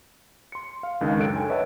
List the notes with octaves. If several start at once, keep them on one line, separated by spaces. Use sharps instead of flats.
C6 C#7
F5
C#2 D#3 G#3 D4
F#2 A4 F#6 D7
G5 G#5
B4 C#5 D#5 E5 F#5 A5